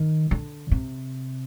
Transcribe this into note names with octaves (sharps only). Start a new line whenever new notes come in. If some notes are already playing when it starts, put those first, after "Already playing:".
Already playing: D#3
D3
C3